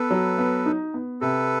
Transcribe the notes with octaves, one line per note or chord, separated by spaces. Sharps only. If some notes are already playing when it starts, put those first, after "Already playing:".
Already playing: B3 A4 B4
F#3
B3
D#4
B3
C3 A4 B4